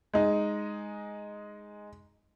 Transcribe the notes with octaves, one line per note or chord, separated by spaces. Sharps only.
G#3 D#4